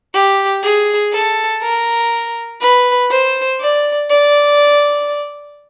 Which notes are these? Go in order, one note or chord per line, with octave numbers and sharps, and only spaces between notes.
G4
G#4
A4
A#4
B4
C5
D5
D5